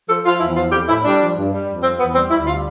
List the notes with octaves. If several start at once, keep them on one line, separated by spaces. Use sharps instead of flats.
F3 A4
F3 F4
E2 E4
F3 F4
F2 G4
A2 E4
G3 D4
F3
G2
G3
F2
F3 C4
E2 B3
G3 C4
D2 E4
G3 F4